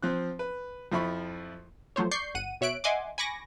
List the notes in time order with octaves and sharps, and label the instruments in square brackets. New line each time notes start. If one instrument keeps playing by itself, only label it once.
[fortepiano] F3 C4 F#6
B4
F2 F3 E4 B5 C#6
[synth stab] F3 F#3 A3 C5 C#5
D5 C#6 G6 C7
G1 F#5 D#7
B2 C#5 E5 F#6 D7
D#5 E5 F#5 G#5 C6 D6
G#5 B5 C#6 D6 A#6